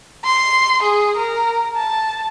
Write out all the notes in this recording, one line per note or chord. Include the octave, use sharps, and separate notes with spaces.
C6
G#4
A#4
A5